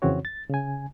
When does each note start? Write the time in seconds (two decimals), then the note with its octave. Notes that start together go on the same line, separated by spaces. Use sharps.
0.02 F2 C#3 E3 C4 F#4 C#5
0.25 A6
0.49 C#3 G#5